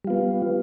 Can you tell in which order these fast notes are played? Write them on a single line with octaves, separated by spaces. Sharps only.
G3 F4 B3